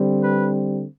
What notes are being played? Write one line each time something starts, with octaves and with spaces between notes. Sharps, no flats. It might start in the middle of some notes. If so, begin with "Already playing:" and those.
Already playing: D3 G3 C4
B4